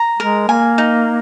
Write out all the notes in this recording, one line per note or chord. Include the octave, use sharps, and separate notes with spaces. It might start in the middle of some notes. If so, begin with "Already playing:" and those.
Already playing: A#5
G#3 A#4
A#3 G#5
D#4